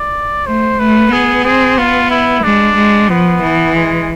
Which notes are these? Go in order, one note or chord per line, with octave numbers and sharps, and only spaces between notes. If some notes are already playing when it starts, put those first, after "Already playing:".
Already playing: D5
A3 C5
A3 B4
B3 G#4
C4 G#4
B3 F4
E4
G#3 D4
G#3
F3 B3
E3
G#3